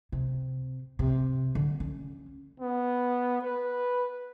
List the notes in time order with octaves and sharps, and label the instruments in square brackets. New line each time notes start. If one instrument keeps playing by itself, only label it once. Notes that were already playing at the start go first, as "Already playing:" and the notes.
[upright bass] C3
C3
D3
C#4
[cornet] B3
B4